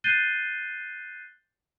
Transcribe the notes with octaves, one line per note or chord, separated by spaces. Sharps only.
F#6 G6 A6 C7 D#7 G7